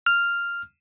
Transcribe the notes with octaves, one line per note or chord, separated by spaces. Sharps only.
F6